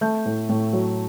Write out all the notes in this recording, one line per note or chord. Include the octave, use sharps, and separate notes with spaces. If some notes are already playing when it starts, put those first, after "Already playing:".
A3 G6
A2
A2
F#3